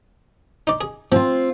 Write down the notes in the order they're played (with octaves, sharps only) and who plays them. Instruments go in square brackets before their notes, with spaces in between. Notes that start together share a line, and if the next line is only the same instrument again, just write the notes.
[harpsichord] D#4 D5
G#4
[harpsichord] F3 [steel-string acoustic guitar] C4 F4